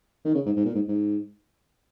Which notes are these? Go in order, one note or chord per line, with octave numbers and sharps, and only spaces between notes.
D#3
C#3
G#2
G#2
A#2
G#2
G#2